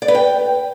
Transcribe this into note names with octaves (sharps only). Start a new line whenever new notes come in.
D5
B4
G5